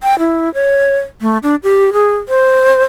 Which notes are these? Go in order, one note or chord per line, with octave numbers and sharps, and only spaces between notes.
G5
E4
C#5
A3
D4
G4
G#4
C5